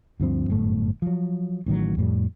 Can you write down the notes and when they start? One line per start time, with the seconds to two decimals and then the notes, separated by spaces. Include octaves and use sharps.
0.20 D2 G2 F3 C4
0.50 G1 F#2 A2 A3
1.02 F3 F#3
1.66 A1 A2 D#3 F#3
1.97 F2 A2 G3